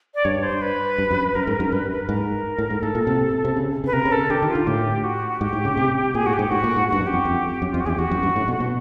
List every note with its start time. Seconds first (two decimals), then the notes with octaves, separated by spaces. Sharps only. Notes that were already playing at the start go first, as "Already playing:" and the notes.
0.15 D5
0.25 G2 C#5
0.43 C5
0.62 B4
0.98 G2
1.11 F#2
1.35 F#2 A#4
1.47 G#2
1.60 F#2
1.72 G2 B4
1.91 B4
2.09 G#2 A#4
2.58 A2
2.70 G#2
2.82 A2 A4
2.95 A#2
3.07 C3
3.45 C3
3.57 C#3
3.84 C#3 B4
3.93 C3 A#4
4.05 C#3
4.12 A4
4.30 D3 G4
4.42 D#3
4.48 F4
4.55 D3
4.67 A2 G4
5.04 F#4
5.41 G#2 G4
5.53 A2
5.65 C#3
5.77 C3
6.15 A#2 G#4
6.26 A2 F#4
6.33 G4
6.39 G#2
6.51 A2 F#4
6.64 A#2
6.76 G#2
6.88 G2 F#4
7.01 F#2
7.07 G4
7.13 F2
7.25 F2
7.62 F#2
7.71 F2 F4
7.80 F#4
7.85 E2 G#4
7.89 G4
7.98 E2 F#4
8.11 F#2
8.23 G2
8.36 A2
8.48 B2
8.60 B2